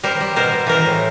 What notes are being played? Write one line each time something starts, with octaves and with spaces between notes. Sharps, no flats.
G3 A#4 C5
G3
B2 A#4 C5
B2
E3 A#4 C5
A2